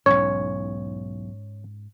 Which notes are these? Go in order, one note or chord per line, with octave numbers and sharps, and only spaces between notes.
B1 E2 G#2 C#4 C#5